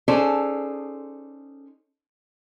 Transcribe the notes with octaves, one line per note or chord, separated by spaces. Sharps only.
C#4 D#4 G#4 A4 C5 D5